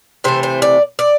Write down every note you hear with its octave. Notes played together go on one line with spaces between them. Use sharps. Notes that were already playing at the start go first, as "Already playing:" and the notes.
C3 E3 A3 C5
C5
D5
D5